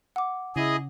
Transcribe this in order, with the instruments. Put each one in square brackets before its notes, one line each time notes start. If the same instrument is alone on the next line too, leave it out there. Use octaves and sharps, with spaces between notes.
[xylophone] F#5 D6
[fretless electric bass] C#3 [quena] E4 [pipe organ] G#4 D#5